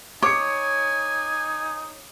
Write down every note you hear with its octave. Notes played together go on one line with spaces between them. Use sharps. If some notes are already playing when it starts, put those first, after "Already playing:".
D#4 C#5 G#5 D6 C#7